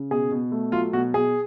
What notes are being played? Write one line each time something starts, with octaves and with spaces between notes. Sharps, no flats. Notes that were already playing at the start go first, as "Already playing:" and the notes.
Already playing: C#3
B2 G#4
B2
A3
F#3 F4
B2 F#4
B2 G#4